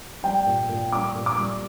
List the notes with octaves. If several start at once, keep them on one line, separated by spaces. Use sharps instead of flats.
G3 G5
A#2
A#2
G3 D6
A#2
D6
G3